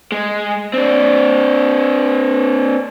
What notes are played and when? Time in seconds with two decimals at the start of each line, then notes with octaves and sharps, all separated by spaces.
0.12 G#3
0.74 C4 D4